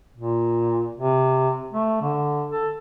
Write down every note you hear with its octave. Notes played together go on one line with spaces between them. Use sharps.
A#2
C3
A3
D3
A4